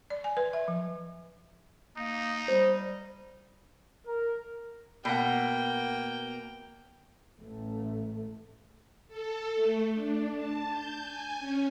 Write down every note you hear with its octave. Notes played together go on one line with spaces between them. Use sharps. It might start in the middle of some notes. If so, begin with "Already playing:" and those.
D5
G#5
B4
E5
F3
A#3 D#4
G3 C5
A#4
B2 A#3 F#5 G5
A1 A3
A4
A3
D4
A5
G6
G#5
C#4